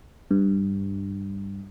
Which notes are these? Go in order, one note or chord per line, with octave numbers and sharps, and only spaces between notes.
G2